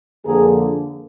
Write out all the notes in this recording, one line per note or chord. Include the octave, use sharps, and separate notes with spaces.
F2 D3 F3 A#3 G#4 A#4